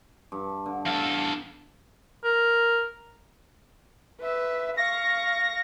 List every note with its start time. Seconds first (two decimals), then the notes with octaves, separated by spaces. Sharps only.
0.32 G2
0.66 D3
0.86 E2 A4 F5
2.24 A#4
4.21 B4 E5
4.77 F5 C#6 A#6